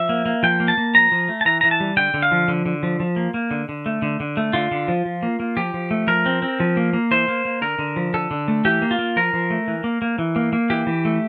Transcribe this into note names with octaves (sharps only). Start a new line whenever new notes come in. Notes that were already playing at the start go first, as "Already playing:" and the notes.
Already playing: F3 E5
A#3
A#3
F3 G5
A#3
A5
A#3
F3 A#5
F3
A3
A5
E3 A#5
E3 A#5
A5
G3
D3 G5
D3
F5
F3
D3
D3
F3
F3
A#3
A#3
D3
D3
A3
D3
D3
A3
D3 F4
D3
F3
F3
A#3
A#3
F3 G4
F3
A3
F3 A#4
C4
C4
F3
A#3
A#3
E3 C5
A#3
A#3
D3 A#4
D3
F3
D3 A4
D3
A3
E3 G4
A#3
F4
A#3
F3 A#4
F3
A3
E3
A#3
A#3
E3
A#3
A#3
E3 G4
E3
A3